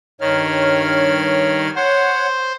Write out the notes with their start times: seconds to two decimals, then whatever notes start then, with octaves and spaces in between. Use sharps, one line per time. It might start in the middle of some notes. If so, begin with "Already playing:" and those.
0.21 G2 D#3 C#5 F6
1.76 C5 C#5 F#5